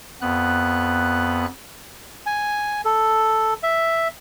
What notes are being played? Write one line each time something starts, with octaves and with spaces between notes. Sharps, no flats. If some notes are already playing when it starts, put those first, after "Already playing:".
F2 B3 F#6
G#5
A4
E5